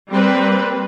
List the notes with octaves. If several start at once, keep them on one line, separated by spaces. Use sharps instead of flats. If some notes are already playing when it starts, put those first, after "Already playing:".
G3 A#3 C4 B4